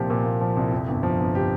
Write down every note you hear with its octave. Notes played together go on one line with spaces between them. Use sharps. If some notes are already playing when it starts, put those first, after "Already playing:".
Already playing: C2 A#2 F3 A#3 G4
A#2
A#3
F3
C2
F2
G1
F3
G1
G4